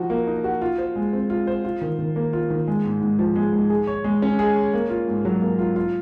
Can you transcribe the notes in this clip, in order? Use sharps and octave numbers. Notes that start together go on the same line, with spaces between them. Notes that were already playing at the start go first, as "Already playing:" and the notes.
Already playing: F3 D#4 F#4
A#3
D#4
F#4
F4
C5
G#3
C4
F4
C5
F4
D#3
D#3
A#3
F4
D#3
G#3
G#2
G#2
F3
G#3
G#2
G#4
C#5
G#3
C#4
G#4
C#5
A#3
F4
G#2
F#3
A#3
F4
F4